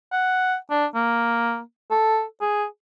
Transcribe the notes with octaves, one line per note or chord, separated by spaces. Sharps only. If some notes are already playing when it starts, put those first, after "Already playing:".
F#5
D4
A#3
A4
G#4